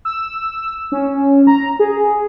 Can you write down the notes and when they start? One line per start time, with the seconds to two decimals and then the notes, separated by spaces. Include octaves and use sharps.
0.05 E6
0.92 C#4
1.47 A#5
1.80 G#4